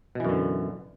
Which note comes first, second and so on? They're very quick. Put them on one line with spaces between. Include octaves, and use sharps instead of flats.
B2 E3 F#2 D3